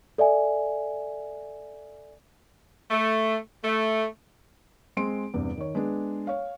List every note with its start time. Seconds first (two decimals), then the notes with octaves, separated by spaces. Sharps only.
0.18 A4 D5 E5 G#5
2.91 A3
3.64 A3
4.97 G#3 C4 C6 D7
5.34 E2 G2 C3
5.58 D#3 C#5
5.75 G#3 B3 D4
6.27 C#5 F5